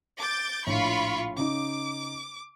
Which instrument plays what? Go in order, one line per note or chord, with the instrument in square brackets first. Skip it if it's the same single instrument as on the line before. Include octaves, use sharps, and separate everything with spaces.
[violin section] D6 G6 A6
[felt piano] A#1 A2 [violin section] F4 B5 C#6
[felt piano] C#3 D#4 [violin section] D6